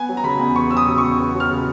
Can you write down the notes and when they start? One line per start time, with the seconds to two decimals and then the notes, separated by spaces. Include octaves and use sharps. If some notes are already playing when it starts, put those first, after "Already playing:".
Already playing: B3 G#5
0.09 F#3
0.17 A#5
0.24 C#3 B5
0.40 E2
0.56 B3 C#6
0.71 F#3 E6
0.77 D#6
0.87 C#3
0.98 E2 C#6
1.19 B3
1.35 F#3
1.40 F6
1.50 C#3